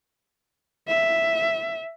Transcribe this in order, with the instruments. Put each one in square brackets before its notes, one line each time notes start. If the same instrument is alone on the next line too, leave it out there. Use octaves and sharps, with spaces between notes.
[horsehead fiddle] E5